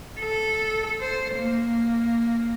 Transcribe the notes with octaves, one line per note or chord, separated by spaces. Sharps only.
A4
C5
A#3